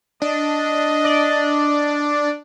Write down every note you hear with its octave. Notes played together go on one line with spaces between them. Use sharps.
D4 D#5
D5